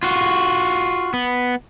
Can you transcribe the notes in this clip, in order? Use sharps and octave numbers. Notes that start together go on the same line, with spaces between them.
F4 F#4
B3